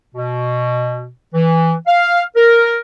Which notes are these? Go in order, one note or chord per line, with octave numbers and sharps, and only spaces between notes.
B2
E3
F5
A#4